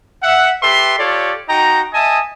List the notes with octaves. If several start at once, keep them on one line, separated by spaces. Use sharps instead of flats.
E5 F#5
G4 A4 B4 E5 C6
F4 G4 A4 C#5 D5
D#4 F#4 D#5 G5 A#5
D#5 E5 G#5 A5 D#6